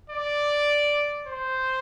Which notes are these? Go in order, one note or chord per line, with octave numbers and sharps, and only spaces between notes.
D5
C5